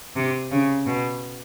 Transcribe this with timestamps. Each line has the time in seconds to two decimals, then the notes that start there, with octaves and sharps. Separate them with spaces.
0.16 C3
0.51 C#3
0.86 B2